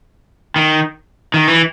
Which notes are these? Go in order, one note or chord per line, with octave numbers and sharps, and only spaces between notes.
D#3
D#3
E3